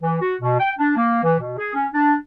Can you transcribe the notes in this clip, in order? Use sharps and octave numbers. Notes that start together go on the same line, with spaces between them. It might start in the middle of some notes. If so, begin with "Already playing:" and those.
E3
F#4
B2
G5
D4
A#3
E3
B2
G#4
C#4
D4